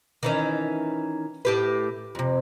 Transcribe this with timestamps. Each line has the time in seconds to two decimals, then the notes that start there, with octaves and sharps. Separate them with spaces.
0.23 D#3 E3 C#4
1.45 A2 G4 B4
2.15 F2 C3